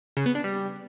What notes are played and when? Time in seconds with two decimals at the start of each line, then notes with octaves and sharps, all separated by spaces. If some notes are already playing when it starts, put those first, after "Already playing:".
0.17 C#3
0.26 B3
0.35 D4
0.44 G3